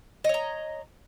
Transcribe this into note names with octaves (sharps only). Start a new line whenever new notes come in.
C#5 D#5 A#5